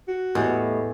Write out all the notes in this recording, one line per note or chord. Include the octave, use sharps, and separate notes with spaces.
F#4
E2 A2 G4 B4 D#5